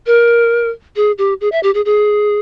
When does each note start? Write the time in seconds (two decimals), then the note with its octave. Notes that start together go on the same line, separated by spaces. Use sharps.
0.06 A#4
0.96 G#4
1.18 G4
1.41 G#4
1.52 E5
1.63 G4
1.74 G#4
1.85 G#4